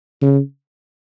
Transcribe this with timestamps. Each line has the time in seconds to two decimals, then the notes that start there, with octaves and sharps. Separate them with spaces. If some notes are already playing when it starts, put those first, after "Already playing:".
0.22 C#3